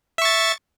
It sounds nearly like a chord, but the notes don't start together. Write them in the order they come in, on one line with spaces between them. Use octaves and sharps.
E5 C#6 A6